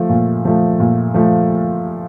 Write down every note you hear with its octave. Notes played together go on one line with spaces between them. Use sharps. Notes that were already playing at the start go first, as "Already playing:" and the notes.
Already playing: F3 A3
A#2
F3 A3
A#2
F3 A3